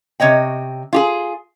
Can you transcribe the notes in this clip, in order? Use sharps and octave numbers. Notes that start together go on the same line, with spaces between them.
C3 C#5 D#5 G5
F4 G4 G#4